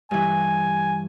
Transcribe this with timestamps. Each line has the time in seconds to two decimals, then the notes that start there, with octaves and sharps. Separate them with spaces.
0.11 G2 E3 G#5